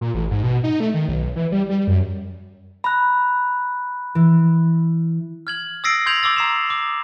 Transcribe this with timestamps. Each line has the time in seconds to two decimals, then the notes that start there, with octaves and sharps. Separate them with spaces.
0.01 A#2
0.14 A1
0.31 G#2
0.43 B2
0.64 D#4
0.80 A3
0.94 D#3
1.08 B1
1.36 E3
1.52 G3
1.69 G3
1.87 F#2
2.84 A#5 B5 F#6
4.15 E3
5.47 F6 G#6 F#7
5.84 D#6 E6 A6 A#6 C7 D7
6.06 C6 G6 G#6 F7 F#7
6.23 C6 D6 E6 A6
6.36 A#5 C7 E7
6.70 D6